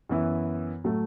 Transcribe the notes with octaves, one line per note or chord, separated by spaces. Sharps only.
F#2 E3 B3 E4
A2 F#3 A3